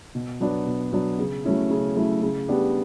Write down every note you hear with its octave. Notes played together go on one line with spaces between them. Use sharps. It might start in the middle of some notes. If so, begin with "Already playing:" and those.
B2
F#3 B3 D4
B2
F#3 B3 D4
C#3
F#3 A3 C#4 E4
C#3
F#3 A3 C#4 E4
C#3
G3 B3 D4 G4